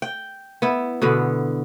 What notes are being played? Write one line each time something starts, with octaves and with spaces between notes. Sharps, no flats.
G5
B3 E4
B2 D3 B3